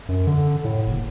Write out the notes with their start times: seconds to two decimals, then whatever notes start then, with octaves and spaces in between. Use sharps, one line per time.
0.09 F#2
0.27 D3
0.64 A2
0.86 F#1